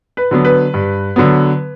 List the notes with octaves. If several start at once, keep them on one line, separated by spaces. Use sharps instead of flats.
B4
D3 F#3 B3
B4
G2
D3 F#3 B3